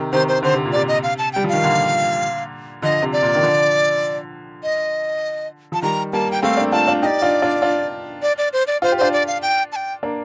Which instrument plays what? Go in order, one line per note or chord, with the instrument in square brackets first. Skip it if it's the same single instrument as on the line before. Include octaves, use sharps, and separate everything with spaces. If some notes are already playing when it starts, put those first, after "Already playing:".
Already playing: [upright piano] C3 D#3
[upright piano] C3 D#3 [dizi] C5
[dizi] C5
[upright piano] D3 [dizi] C5
[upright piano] C3
A#2
[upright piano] C3 [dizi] D5
[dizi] D#5
F5
A5
[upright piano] G3 [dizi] G5
[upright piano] F3
[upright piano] D#3 [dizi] F5
[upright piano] A#2 D3
[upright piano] D3 F3 [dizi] D#5
[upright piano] C3
[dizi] D5
[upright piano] A#2
D#3
D3 F3
[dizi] D#5
[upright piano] F3 [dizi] A5
[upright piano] D#3 G3 [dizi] A#5
[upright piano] G3 A#3 [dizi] A5
[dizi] G5
[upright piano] A3 C4 [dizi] F5
[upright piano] A#3 D4
[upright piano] D4 F4 [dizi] A5
[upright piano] D4 F4
[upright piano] D#4 G4 [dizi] D5 D#5
[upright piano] D4 F4
D4 F4
D4 F4
[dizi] D5
D5
C5
D5
[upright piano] F4 [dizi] C5
[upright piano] G4
[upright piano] D4 F4 [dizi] C5
[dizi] D5
F5
G5
A5
G5
[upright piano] A#3 D4